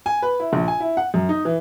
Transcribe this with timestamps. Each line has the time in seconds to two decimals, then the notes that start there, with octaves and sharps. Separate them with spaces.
0.06 G#5
0.22 B4
0.40 E4
0.53 A#1
0.68 G#5
0.80 E4
0.97 F#5
1.14 F#2
1.29 D#4
1.45 E3